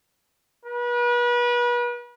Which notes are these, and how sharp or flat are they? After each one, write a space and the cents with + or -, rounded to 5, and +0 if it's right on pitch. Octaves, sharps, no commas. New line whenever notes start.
B4 -35